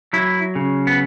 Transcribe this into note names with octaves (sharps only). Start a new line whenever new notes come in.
F#3 E4
C#3
B3